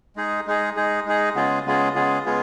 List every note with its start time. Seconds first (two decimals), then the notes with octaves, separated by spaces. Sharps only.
0.16 G#3 D#4 G#4
0.47 G#3 D#4 G#4
0.76 G#3 D#4 G#4
1.06 G#3 D#4 G#4
1.35 C#3 G#3 B3 F4 G#4
1.65 C#3 G#3 B3 F4 G#4
1.95 C#3 G#3 B3 F4 G#4
2.25 C#3 G#3 B3 F4 G#4